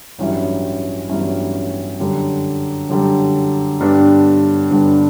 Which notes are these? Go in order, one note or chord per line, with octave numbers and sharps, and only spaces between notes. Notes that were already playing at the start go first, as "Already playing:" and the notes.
A1 G2 F#3 C#4 E4
A1 G2 F#3 C#4 E4
F#2 D3 G3
F#2 D3 G3
G2 D3 G3 B3 D4
G2 D3 G3 B3 D4